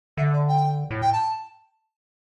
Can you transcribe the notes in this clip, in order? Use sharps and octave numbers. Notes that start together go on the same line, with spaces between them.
D3 E5
D5
G5
A2
G5
A5